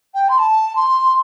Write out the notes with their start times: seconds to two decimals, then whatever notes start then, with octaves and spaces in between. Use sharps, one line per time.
0.14 G5
0.29 C6
0.39 A5
0.75 C6